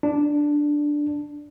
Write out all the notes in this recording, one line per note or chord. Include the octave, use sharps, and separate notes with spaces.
D4